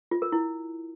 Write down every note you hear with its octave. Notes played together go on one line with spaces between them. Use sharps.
F4
A#4
E4